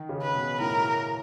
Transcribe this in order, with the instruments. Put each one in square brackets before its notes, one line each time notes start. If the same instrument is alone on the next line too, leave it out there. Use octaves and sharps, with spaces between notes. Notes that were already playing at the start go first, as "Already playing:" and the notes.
Already playing: [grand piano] D#3
C#3
[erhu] B4
[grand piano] B2
[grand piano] A2 [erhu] A#4